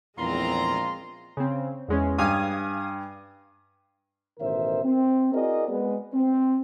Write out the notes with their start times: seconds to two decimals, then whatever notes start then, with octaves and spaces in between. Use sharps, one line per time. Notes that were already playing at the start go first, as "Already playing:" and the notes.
0.18 A#1 E2 G#3 C4 E4 F4 A#5 C6
1.37 C#3 C4
1.88 E2 G#3 C#4
2.18 G2 F5 G#5 D#6
4.39 A1 B2 D#3 A#4 C5 E5
4.83 C4
5.33 E4 F#4 G#4 A#4 D5 D#5
5.68 G#3 B3
6.13 C4